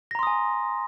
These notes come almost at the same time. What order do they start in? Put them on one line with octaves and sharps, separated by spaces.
A#6 A#5 C6 D#6 G#5